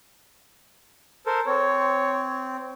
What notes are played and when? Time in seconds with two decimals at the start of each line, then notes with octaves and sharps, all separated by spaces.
1.26 A4 A#4 C5
1.47 C4 C#5